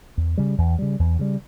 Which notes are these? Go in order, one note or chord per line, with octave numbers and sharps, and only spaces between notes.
E2
C#3 G3
E2
C#3 G3
E2
C#3 G3